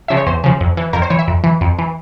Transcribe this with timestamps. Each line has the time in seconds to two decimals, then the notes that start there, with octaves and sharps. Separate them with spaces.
0.08 C#3 F3 E5
0.17 C#5
0.26 E2 C5
0.44 C#3 F3
0.61 F2
0.77 E3
0.93 F2 A#4
1.02 C5
1.10 E3 C#5
1.19 E5
1.28 F2
1.44 E3
1.61 F2
1.79 E3